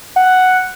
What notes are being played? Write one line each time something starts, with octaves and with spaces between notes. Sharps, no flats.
F#5